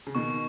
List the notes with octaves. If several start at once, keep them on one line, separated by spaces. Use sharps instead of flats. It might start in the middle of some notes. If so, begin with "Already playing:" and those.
C#3
B2 D#3 C#6